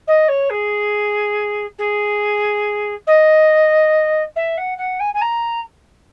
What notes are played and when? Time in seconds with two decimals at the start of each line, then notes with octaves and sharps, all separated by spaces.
0.07 D#5
0.28 C#5
0.50 G#4
1.78 G#4
3.07 D#5
4.36 E5
4.57 F#5
4.78 F#5
5.00 G#5
5.14 G#5
5.21 A#5